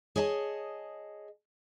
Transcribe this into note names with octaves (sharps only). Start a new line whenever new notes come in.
G#4 C#5 D#5 A5